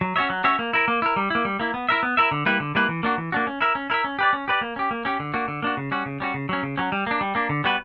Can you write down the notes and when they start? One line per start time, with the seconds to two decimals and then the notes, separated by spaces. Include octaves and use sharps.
0.01 F#3
0.16 C#4 F#4 C#5 E5
0.30 F#3
0.44 C#4 F#4 C#5 E5
0.59 A#3
0.73 E4 A#4
0.88 A#3
1.02 E4 A#4
1.16 G3
1.30 A#3 E4
1.45 G3
1.60 A#3 E4
1.74 B3
1.89 E4 A#4 E5
2.03 B3
2.17 E4 A#4 E5
2.31 D3
2.46 G3 A#3 E4 B4
2.60 D3
2.75 G3 A#3 E4 B4
2.89 E3
3.03 A#3 D4 F#4
3.18 E3
3.32 A#3 D4 F#4
3.47 C#4
3.61 E4 A#4 E5
3.75 C#4
3.90 E4 A#4 E5
4.04 C#4
4.19 G4 B4 D5
4.33 C#4
4.48 G4 B4 D5
4.61 A#3
4.76 C#4 G4
4.91 A#3
5.05 C#4 G4
5.20 D3
5.34 A#3 D4 F#4
5.48 D3
5.62 A#3 D4 F#4
5.77 C#3
5.91 G3 C#4 F#4
6.06 C#3
6.20 G3 C#4 F#4
6.34 C#3
6.49 F#3 C#4
6.63 C#3
6.77 F#3 C#4
6.92 G3
7.07 A#3 D4
7.21 G3
7.35 A#3 D4
7.49 D3
7.64 G3 B3 F#4 B4